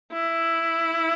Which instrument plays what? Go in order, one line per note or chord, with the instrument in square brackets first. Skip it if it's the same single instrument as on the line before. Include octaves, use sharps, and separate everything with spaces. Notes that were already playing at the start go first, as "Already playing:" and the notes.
[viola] E4